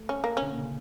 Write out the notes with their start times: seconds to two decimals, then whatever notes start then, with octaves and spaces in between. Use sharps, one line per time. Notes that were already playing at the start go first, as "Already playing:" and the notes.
Already playing: A3
0.09 C#4
0.24 A#3
0.37 D3 C#4
0.51 A#2
0.57 C#3